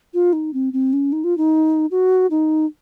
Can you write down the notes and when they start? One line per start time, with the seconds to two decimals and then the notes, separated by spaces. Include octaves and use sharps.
0.14 F4
0.33 D#4
0.54 C4
0.73 C4
0.93 C#4
1.12 D#4
1.24 F4
1.38 D#4
1.91 F#4
2.31 D#4